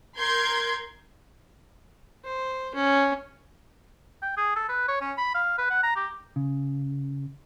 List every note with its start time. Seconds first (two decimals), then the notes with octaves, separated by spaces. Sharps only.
0.18 A#4 C6 G6 G#6
2.25 C5
2.75 C#4
4.22 G5
4.37 G#4
4.56 A4
4.69 B4
4.88 C#5
5.01 C#4
5.18 B5
5.35 F5
5.58 B4
5.70 F#5
5.83 A#5
5.96 G4
6.36 C#3